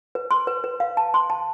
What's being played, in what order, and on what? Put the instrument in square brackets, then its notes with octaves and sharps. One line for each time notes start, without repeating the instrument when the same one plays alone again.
[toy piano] B4
C6
B4
B4
F5
A5
C6
A5